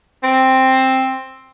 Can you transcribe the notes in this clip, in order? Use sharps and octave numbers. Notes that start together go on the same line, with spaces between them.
C4